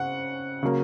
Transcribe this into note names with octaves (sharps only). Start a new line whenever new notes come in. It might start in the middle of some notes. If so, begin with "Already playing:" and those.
Already playing: C#3 C4 F#5
C#3 F#3 A#3